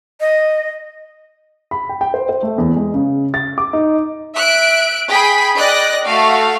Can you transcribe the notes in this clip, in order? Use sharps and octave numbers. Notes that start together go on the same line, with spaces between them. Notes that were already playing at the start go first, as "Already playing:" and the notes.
D#5
B5
G5
G5
C5
C5
A3
E2
G#3
C#3
A6
D6
D#4
E5 F#6 D7
G#4 G5 B5 B6
D5 D#5 G5 F#6 A#6
A3 F#4 F5